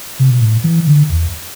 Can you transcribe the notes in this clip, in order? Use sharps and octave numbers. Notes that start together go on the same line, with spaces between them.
C3
B2
A2
E3
D3
E2